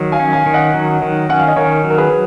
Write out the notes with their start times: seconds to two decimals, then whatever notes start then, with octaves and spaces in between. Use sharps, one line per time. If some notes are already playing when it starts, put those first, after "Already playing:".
Already playing: D#3 F#3
0.12 F5 G#5
0.20 C#4
0.33 F5 G#5
0.46 D#3
0.54 D#5 F#5
0.74 F#3
1.02 D#3
1.29 C#4 F#5
1.39 F5
1.48 D#5
1.56 D#3 A#4 C#5
1.84 F#3
1.90 A#4
1.98 G#4 B4